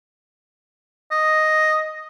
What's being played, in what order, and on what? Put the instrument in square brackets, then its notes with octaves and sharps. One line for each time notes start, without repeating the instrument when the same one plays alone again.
[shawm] D#5